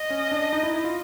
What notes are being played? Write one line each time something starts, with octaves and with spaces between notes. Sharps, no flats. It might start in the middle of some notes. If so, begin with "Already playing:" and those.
Already playing: D#5
C#4
D4
D#4
E4
E4
F4